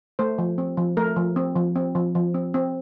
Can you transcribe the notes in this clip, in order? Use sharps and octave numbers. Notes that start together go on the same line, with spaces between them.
A3 C5
F3
C4
F3
A3 A#4
F3
C4
F3
C4
F3
F3
C4
C4